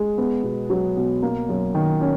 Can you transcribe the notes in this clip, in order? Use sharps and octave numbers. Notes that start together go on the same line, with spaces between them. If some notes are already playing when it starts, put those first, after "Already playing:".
Already playing: G#3
B3
B2
F#3
B2
A#3
F#2
D#3
C#4